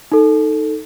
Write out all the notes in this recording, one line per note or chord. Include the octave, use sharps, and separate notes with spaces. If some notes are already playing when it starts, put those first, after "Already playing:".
D#4 A4